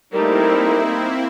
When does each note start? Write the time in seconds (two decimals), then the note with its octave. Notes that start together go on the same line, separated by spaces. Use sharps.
0.13 G3 A3 A#3 C4 D#4 E4 A#4